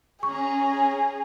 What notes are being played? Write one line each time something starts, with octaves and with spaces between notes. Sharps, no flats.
C#4 G#4 A#5 C#6